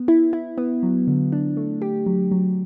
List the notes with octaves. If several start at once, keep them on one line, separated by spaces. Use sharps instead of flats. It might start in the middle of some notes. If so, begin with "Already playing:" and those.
Already playing: B3
E4
E4
B3
F#3
D3
D4
A3
G4
F#3
F#3